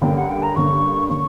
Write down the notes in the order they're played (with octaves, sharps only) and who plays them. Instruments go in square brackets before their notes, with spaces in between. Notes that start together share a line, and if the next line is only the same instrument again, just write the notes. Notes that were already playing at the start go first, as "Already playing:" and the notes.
[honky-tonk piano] G2 D3 A#3 C#4 [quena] G5
[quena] F#5
G5
A#5
[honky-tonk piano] G2 D3 A#3 C#4 [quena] C#6
[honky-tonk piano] D3 A#3 C#4 [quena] C#6